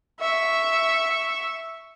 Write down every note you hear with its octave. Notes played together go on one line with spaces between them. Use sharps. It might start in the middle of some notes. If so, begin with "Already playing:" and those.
E5 C#6